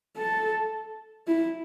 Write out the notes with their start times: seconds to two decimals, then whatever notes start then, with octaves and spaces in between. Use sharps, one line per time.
0.17 A4
1.27 E4